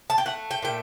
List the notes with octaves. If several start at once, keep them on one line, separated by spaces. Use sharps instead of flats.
A5
G5
A3 F#5
G5
A#2 G5